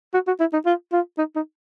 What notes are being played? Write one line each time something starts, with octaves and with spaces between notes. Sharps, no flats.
F#4
F#4
E4
D#4
F4
F4
D#4
D#4